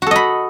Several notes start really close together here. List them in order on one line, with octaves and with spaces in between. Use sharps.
F#4 A4 D#5 B5